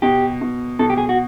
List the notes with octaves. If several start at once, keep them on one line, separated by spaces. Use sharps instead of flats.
B2 G4
B2
B2 A4
G4
G#4
F#4